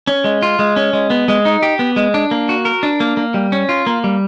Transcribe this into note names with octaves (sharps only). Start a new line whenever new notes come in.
C#4
G#3
F4
G#3
C#4
G#3
B3
G#3
D#4
G4
B3
G#3
D4
A#3
F#4
A#4
D4
A#3
A#3
G3
C#4
F4
A#3
G3